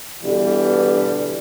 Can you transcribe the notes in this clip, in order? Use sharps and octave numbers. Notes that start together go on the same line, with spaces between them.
B2 D3 E3 G3